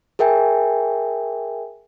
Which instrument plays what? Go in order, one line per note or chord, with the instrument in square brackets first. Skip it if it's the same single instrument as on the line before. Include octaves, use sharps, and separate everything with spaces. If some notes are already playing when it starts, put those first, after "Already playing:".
[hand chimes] G#4 A#4 E5 G5 G#5